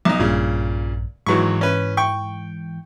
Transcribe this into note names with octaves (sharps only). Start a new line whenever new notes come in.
B1 D#4
A#1 G2 A#2 C#3
G#1 G#2 E3 F#3 C#6
C#4 B4
G5 C#6